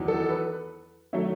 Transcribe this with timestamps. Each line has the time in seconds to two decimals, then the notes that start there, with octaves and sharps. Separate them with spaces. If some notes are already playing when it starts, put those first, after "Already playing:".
Already playing: E2 D#3 F#3
0.08 A4
0.29 B4
1.13 D#3 F#3 A3 C#5 E5